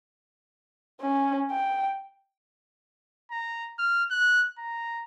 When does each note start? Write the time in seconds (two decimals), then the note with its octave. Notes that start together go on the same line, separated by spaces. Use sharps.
1.01 C#4
1.51 G5
3.31 A#5
3.79 F6
4.11 F#6
4.58 A#5